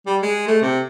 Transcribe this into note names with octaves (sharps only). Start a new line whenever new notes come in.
G3
G#3
A3
C3